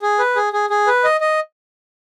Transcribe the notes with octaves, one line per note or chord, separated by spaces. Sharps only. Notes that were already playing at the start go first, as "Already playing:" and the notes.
G#4
B4
G#4
G#4
G#4
B4
D#5
D#5